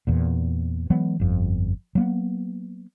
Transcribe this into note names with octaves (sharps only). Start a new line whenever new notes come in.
E2 A#2
E3 F#3 G#3 B3
G1 F2
F#3 A#3 B3